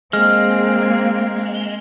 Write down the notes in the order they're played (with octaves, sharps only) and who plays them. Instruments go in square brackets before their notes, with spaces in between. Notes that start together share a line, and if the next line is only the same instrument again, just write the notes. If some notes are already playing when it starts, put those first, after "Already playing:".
[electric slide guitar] G#3 [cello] A#3 C4 [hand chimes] F6